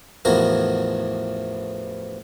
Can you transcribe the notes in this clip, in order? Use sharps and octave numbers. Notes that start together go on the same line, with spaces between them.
A1 E2 E3 F3 F#4 A#4